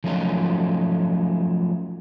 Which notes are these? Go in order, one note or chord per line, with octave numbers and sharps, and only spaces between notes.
F3 F#3 A3 C#4 D#4 F4